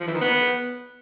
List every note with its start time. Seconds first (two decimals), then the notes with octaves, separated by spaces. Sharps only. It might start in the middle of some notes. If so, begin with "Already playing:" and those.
0.01 F3
0.07 E3
0.14 D#3
0.21 B3